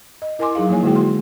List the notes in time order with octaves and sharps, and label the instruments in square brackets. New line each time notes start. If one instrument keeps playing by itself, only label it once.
[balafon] D#5
E4 A#4 D#5 G#5 C6 D6
F#3 D#4 G#4 F5
F3 A#3 E4 C#5 G#5
D3 G#3 E4 F#4 G#4 G5
F#4 C6